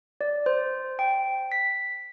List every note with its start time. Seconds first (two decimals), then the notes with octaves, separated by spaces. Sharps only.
0.21 D5
0.46 C5
0.99 G5
1.52 B6